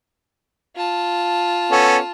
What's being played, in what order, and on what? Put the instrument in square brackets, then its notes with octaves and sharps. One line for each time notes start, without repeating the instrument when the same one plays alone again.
[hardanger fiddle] F4 A5
[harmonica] B3 C#4 A4